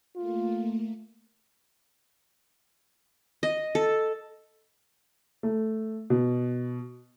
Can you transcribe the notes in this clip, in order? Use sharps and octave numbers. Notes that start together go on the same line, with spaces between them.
A3 A#3 F4
D#5
A4
A3
B2